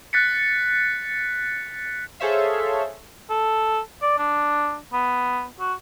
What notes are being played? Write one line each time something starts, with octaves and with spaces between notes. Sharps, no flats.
F#6 A6 B6 C#7
G#4 A4 C5 C#5 E5 F5
A4
D5
D4
B3
F#4